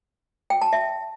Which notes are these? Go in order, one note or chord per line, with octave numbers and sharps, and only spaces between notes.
G5
A5
E5